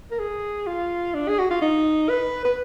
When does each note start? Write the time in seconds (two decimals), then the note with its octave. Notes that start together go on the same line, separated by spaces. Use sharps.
0.11 A#4
0.19 G#4
0.66 F4
1.14 D4
1.28 G#4
1.39 F#4
1.50 F4
1.62 D#4
2.09 B4
2.45 B4